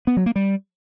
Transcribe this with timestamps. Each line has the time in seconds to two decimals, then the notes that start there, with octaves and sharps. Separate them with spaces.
0.07 B3
0.17 F#3
0.26 A#3
0.36 G3